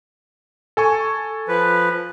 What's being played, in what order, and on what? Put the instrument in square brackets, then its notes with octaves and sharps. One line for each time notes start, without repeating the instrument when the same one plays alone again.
[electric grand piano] A4 G#5 C#6
[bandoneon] F3 B4